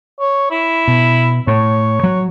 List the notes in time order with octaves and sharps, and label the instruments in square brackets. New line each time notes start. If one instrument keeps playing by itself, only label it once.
[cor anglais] C#5
E4
[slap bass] B2
[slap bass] A2 [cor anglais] C#5
[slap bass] F#3